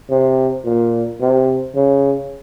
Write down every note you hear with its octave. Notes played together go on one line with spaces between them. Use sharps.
C3
A#2
C3
C#3